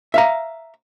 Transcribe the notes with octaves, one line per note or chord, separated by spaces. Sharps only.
E5 F5 A#5